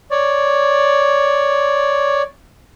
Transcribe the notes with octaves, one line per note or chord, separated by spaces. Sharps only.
C#5 D5